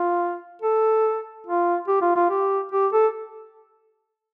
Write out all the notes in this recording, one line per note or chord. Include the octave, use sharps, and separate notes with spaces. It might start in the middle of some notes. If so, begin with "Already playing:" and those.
Already playing: F4
A4
F4
G4
F4
F4
G4
G4
A4